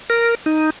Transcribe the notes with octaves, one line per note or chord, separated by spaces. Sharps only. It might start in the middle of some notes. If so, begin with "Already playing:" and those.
A#4
D#4